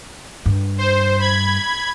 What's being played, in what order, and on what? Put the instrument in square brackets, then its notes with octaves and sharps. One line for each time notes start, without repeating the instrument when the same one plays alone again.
[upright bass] G2
[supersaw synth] C5
B5 G#6